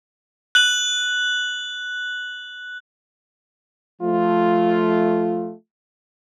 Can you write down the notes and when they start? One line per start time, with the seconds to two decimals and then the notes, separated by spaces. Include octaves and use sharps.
0.55 F#6 F#7
4.02 F3 A3 F4